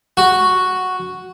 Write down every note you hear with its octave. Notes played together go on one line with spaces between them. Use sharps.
F#4